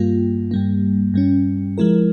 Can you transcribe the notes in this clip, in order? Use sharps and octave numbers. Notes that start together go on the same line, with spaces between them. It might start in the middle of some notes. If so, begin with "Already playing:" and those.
Already playing: G2 G3 A#3 F4
G2 G3 A#3
G2 G3 C#4
F3 G#3 E4 A#4